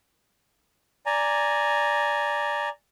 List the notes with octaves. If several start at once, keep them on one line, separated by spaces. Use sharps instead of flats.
D5 G#5 A#5